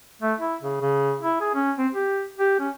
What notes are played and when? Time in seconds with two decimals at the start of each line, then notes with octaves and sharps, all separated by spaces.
0.22 A3
0.40 E4
0.62 C#3
0.82 C#3
1.21 E4
1.41 G#4
1.54 C#4
1.78 C4
1.92 G4
2.39 G4
2.60 C#4